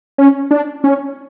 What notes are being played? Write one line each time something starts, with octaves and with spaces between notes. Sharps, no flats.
C#4
D4
C#4